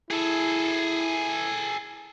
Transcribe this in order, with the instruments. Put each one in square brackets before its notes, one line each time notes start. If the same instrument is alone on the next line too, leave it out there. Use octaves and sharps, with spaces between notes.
[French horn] E4 [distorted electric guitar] G#4 A4